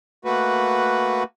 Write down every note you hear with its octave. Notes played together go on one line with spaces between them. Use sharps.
A3 A#3 F#4 B4